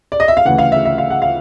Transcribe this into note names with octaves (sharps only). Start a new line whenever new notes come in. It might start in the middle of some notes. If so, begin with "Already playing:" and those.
D5
D#5
E5
F5
D2 C#3 E3 F#5
F5
E5
E5
F5
F#5
F5